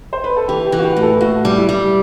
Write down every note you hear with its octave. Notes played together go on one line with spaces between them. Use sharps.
C5
B4
A4
E3 G4
G4
E3
F#4
G4
A2
A4
A2 F#4
G3
E4
G3